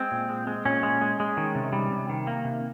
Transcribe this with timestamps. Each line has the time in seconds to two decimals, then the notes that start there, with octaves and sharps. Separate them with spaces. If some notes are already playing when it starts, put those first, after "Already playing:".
Already playing: G#3 C4
0.11 A#2
0.29 G#3
0.47 G#3
0.65 A#2 C#4
0.83 G#3
1.01 G#3
1.20 G#3
1.37 D#3
1.55 C3
1.73 G3
1.91 C3
2.09 D#3
2.27 A#3
2.45 C3